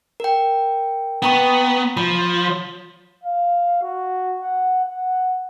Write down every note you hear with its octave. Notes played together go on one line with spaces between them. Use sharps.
A#4 G5
B3 G5 A#5 C#6
F3 B5
F5
F#4
F#5
F#5